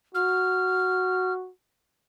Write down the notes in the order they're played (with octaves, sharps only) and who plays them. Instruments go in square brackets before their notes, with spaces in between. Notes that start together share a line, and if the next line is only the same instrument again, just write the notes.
[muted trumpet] F#4 [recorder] F6